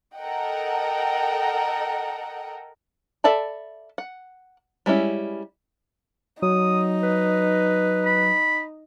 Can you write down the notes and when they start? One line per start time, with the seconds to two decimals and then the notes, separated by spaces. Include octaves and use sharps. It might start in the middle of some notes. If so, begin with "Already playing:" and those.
0.17 A4 A#4 D#5 F#5 G5
3.24 A4 D5 E5 A5 B5
3.98 F#5
4.86 G3 G#3 C#4 E4
6.42 F#3 D#4 D#6
7.03 B4
8.06 B5